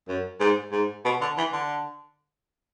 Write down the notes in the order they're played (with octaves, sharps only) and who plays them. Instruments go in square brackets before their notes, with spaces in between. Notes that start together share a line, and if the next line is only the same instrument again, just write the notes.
[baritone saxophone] F#2
G#2
G#2
B2
D3
E3
D3